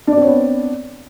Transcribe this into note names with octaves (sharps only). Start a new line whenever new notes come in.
B3 C4 D4 C#5 D5